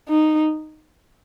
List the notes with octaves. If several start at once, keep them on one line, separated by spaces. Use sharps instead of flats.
D#4